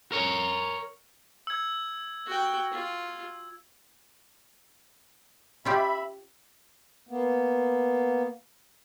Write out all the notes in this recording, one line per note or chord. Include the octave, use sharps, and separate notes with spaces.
A#4 C#5
E6 G#6
F#4 G5
F4
C#4 F4 G4 E5 B5
A#3 B3